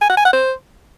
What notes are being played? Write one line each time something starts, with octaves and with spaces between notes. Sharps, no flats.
G#5
F#5
G#5
F#5
C5